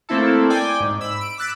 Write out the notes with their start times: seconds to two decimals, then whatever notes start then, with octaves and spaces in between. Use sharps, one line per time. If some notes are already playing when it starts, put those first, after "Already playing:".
0.09 A3 A#3 C4 E4 A4
0.50 D5 G5 G#5 D6
0.80 G#2
1.01 B5 E6
1.21 D7
1.38 D6 E6 F#6 A6 B6